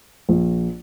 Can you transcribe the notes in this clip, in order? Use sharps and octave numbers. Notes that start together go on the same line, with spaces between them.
A#1